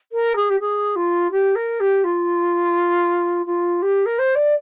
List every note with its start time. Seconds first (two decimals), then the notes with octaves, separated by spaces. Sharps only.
0.12 A#4
0.36 G#4
0.50 G4
0.60 G#4
0.96 F4
1.31 G4
1.55 A#4
1.80 G4
2.04 F4
3.46 F4
3.82 G4
4.05 A#4
4.18 C5
4.35 D5